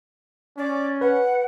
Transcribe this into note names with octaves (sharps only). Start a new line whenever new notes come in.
C#4 D5
B4 F#5